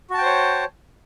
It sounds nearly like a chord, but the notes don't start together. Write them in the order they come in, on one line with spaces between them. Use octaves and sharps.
F#4 A5 G5 C5 C#5